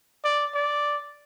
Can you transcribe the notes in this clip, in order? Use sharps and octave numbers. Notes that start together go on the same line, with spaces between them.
D5
D5